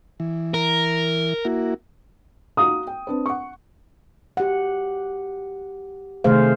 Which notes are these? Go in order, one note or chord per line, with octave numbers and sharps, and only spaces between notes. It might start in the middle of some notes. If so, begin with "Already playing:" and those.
E3
A#4
A#3 E4 F#4
F#4 F5 A#5 D#6
G5
C4 D4 B4
F#5 C#6
G4 F#5
C3 D#3 A3 G#4 C5 F5